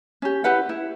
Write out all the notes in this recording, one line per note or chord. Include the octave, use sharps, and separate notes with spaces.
C#4 G4
E4 G4 B4 F#5
E4